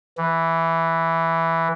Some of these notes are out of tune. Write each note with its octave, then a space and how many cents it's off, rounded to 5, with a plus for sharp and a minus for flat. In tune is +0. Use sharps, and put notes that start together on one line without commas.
E3 +0